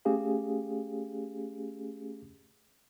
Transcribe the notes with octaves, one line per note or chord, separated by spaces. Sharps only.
A3 C#4 G4 G#4 F5